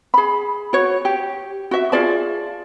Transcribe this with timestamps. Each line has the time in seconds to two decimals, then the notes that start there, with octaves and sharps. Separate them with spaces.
0.14 G#4 B5
0.73 F#4 C#5
1.05 G4
1.71 F#4 E5
1.92 F4 G#4 D5 A5